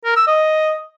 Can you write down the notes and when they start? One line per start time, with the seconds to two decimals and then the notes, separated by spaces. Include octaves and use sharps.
0.05 A#4
0.16 E6
0.27 D#5